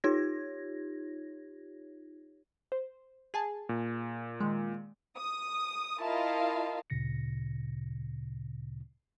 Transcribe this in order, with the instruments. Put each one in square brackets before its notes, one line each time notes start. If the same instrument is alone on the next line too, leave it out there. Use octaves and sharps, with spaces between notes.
[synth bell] D#4 F4 G4 C#5 G#6 A#6
[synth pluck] C5
G#4 G#5 A5
[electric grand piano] A#2
[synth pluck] D#3 G#3
[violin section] D#6
E4 F4 A#4 D#5 F5 A5
[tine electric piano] D2 A#2 C#3 A#6 C#7